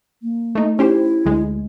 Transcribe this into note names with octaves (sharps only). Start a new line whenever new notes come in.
A#3
A3 D#4
C#4 E4 G4 C5
D2 G#3